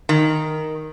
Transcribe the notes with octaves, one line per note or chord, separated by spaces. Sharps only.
D#3